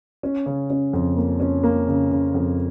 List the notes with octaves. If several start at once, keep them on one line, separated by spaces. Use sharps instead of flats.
C#4
C#3
C#4
F2
A#3
C#4
A#3
C#3
C#3
F2